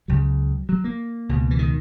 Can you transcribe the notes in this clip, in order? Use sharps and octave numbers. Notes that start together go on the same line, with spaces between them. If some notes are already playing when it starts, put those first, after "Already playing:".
C#2 C#3 F#3
F#3
A#3
C#2 B2
E3
D#3